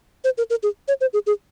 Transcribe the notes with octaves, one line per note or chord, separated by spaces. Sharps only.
C5
A#4
A#4
G#4
C#5
C5
G#4
G#4